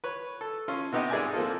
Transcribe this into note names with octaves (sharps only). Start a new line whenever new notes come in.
B4 C#5
A4
C#4 F4 C6
C3 B3 D#4 G4
G#2 G#4 D5 E5 G#5
F3 A#3 C4 F4 A4